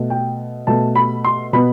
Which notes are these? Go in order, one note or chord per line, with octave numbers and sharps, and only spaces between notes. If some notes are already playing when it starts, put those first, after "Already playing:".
Already playing: B2 A3
G5
B2 A3 A5
B5
C6
B2 B3 B5